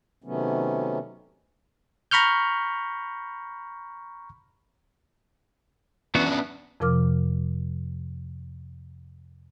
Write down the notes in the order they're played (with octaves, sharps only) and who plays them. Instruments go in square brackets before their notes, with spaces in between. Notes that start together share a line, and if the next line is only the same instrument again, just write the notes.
[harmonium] C3 D#3 F#3 A3 B3 C#4
[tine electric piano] A#5 B5 C#6 F6 G6
[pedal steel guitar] E3 B3 F#4 [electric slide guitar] C#4 D4 E5
[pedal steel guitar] B3
[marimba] F2 C3 F3 A#4 D6 F6